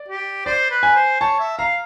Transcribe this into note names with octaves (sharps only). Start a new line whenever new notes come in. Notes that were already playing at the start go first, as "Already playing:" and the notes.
Already playing: D5
G4
C5 D5
B4
G#5
C5
C#5 A5
E5
F5 A#5